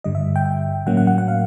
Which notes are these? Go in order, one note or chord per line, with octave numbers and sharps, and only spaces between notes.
G2 D3 G3 D#5
E5
G5
G5
A2 F#3 A#3 C#4 F#5
F#5
F#5
F#5
F5